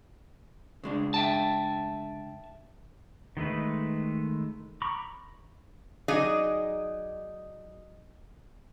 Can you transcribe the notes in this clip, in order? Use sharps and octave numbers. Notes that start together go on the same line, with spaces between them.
C#3 G#3 D4
E5 G5 A5
D#3 G#3 A3 B4
A#5 B5 C#6 D6
F#3 D#4 G#4 D5 D#5